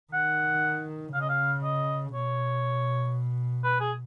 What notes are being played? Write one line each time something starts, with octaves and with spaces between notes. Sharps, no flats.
D#3 F#5
C#3 F5
D#5
F5
D#5
B2 C#5
B4
G#4